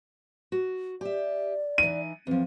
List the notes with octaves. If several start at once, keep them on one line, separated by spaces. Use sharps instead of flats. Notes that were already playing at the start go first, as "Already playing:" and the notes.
F#4
G4 D5 E5
E3 D#4 D#7
E2 F3 C4